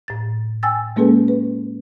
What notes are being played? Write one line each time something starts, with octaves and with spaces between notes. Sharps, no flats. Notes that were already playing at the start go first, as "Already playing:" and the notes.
A2 A6
G5 G#5 E6 A6
G#3 A#3 C#4 G#4 A4 B4
B4